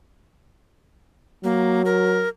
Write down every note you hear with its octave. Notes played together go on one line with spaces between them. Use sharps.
F#3 A#3
A#4